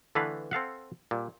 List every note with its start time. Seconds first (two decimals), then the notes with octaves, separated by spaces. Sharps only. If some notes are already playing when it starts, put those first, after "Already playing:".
0.15 D3 E3 A3 A4 B4 F5
0.51 C4 A4 F5 F#5
1.11 A#2 G3